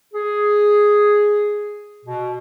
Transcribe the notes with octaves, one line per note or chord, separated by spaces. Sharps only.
G#4
B2